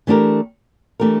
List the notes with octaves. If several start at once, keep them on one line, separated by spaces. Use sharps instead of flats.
E3 A3 D4 G4 A#4
E3 A3 D4 G4 A#4